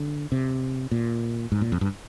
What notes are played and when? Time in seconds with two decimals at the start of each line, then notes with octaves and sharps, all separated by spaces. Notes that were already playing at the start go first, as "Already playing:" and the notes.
Already playing: D3
0.32 C3
0.91 A#2
1.52 G#2
1.61 A#2
1.72 F2
1.81 G2